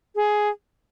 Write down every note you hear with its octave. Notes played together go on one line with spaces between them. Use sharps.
G#4